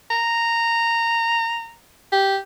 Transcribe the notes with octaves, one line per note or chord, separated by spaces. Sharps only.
A#5
G4